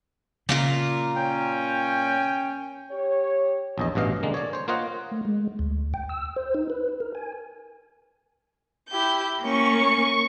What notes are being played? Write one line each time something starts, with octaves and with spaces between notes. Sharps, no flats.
A#2 C#3 F4 A#4
C#4 G5
G4 C#5
A#1 E2 D#5
A1 G2 B2 D#5 F5
D3 G#3 A#3
C#5 D5
C5 C#5
A#3 F4 C5 C#5 D#5 F#5
A3
G#3
D2
G5
E6
C5
D#4
B4
A#4
G#5
E4 G4 G6
A#3 C#4 C#6